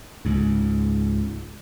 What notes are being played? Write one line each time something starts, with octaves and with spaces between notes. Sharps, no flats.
C#2 G#2